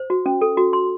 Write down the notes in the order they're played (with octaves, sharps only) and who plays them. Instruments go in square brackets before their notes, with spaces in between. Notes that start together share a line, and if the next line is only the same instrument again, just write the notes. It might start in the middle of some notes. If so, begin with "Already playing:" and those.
Already playing: [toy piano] C5
F#4
C#4
A4
F#4
C6